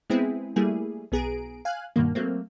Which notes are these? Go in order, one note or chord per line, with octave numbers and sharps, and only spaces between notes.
G#3 B3 C4 E4 G#4
G3 A3 A#3 E4 G#4
B1 B3 G#4 A#5 D7
F5 G#5 F#6
G2 B2 D#3 A#3
F#3 A3 A#3 C4